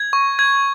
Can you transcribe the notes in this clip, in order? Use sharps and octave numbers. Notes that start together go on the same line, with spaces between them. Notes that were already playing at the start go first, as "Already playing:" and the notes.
Already playing: G#6
C#6
G#6